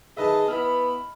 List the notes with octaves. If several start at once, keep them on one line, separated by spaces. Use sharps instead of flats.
D#3 G#4 B4 D#5 E5 A5
B3 E4 B5 F6